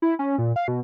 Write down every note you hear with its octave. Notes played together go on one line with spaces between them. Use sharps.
E4
C#4
A#2
F5
B2